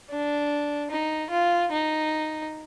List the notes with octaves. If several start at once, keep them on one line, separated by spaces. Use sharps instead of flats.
D4
D#4
F4
D#4